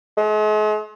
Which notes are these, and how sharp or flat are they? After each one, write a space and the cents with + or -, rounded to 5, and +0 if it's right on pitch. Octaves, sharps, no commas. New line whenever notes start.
G#3 +45